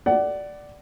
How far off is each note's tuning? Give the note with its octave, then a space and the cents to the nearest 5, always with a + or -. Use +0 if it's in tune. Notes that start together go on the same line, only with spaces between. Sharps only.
D5 +0 F#5 +25